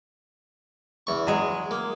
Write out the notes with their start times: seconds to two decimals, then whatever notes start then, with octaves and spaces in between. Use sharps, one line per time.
1.07 E2 C#6
1.27 F#3 G#3
1.71 A#3